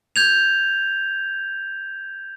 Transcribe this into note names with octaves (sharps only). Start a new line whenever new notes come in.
G6 G#6 F7